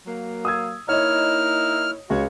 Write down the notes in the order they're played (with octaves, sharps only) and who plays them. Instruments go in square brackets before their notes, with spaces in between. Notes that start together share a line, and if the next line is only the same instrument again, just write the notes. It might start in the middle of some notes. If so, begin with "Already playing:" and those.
[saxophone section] F#3 A#3
[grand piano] D#6 E6 G#6
[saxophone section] A#3 D#4 E4 [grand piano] C#5 D#5 [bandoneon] F6
[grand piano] C#2 [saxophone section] F#4 C#5